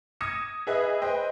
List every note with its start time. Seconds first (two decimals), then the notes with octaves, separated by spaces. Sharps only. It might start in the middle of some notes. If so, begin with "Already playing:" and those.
0.21 D#6 G#6 A#6 C#7 E7
0.67 G#4 B4 D#5 E5
1.02 B4 C5 D#5 G5